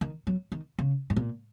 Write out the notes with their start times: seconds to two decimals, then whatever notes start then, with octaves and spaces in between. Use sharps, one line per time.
0.01 D#3
0.27 F#3
0.52 D#3
0.79 C#3
1.10 G#2
1.16 A#2